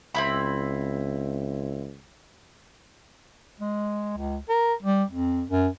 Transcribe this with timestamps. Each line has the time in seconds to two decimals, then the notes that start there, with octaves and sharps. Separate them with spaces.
0.15 C#2 C4 E4 B5
3.60 G#3
4.17 C#2
4.49 A#4
4.82 G3
5.09 F2
5.50 F#2